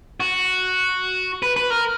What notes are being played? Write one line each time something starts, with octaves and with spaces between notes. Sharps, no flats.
F#4
B4
B4
A#4